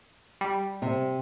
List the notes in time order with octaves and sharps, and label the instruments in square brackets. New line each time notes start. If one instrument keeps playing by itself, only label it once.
[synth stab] G3
[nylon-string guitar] C3